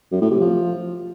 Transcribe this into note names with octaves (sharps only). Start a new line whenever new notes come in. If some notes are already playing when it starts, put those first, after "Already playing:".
F#2
A2
C3
F3